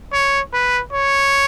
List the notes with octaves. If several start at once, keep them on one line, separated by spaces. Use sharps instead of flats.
C#5
B4
C#5